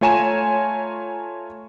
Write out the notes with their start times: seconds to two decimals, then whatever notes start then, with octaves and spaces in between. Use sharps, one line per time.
0.01 A3 F4 C#5 G#5 A#5 E7